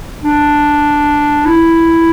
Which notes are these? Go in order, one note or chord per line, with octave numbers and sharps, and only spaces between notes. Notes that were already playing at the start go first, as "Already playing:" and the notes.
D4
E4